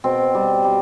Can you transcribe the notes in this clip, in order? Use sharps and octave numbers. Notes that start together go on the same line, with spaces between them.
B2 C4
G3
G3